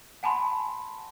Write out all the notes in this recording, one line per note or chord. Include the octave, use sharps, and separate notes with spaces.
F#5 G#5 A5 B5 C6